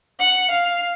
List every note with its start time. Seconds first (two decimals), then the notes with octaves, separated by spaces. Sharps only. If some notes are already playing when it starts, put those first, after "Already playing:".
0.20 F#5
0.51 F5